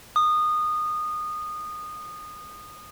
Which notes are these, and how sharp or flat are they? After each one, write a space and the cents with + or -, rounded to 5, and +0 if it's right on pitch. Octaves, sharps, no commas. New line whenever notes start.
D#6 -20